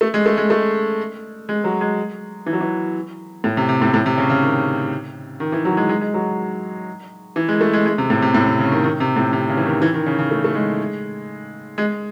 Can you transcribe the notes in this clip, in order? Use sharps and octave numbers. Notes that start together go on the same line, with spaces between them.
A3
G#3
A3
G#3
A3
G#3
F#3
G#3
E3
F#3
E3
A2
C3
C3
A2
A2
C3
C#3
C#3
D#3
D#3
E3
F#3
G#3
G#3
G#3
F#3
E3
G#3
A3
G#3
G#3
C3
A2
C3
A2
C3
C#3
D#3
D#3
C3
A2
C3
C#3
E3
D#3
E3
D#3
C#3
C#3
A3
A3
G#3
G#3